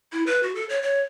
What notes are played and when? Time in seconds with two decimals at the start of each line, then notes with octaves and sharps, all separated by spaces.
0.12 E4
0.26 B4
0.43 F#4
0.55 A4
0.69 C#5
0.82 C#5